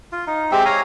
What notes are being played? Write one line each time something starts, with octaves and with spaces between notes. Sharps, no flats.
F4
D#4
G#3 C4 G4 E5
C#5 F5 G#5 A#5